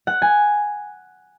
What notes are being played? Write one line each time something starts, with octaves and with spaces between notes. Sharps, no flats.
F#5
G#5